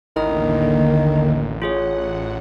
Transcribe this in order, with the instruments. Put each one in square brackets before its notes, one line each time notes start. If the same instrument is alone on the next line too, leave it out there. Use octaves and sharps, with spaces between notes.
[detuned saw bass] A1 [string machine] D#2 D3 A#3 [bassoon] D#3 [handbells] E4 A#5 D#6
[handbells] F4 G#4 C#5 [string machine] F#5